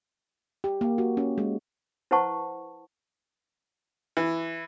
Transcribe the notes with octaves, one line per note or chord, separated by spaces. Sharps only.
G4
A#3
F#4
C#4
G#3
E4 B4 C5 F#5 A5 C#6
E3